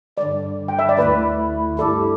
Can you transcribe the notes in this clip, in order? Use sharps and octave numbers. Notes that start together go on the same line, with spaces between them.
G2 D3 G3 D5
G5
E5
D5
D2 D3 A3 E4 B4
G2 G3 E4 G4 A4